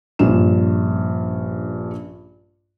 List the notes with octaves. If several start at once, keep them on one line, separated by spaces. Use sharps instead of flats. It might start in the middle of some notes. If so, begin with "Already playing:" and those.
A#1 G2 C#4 F4 E7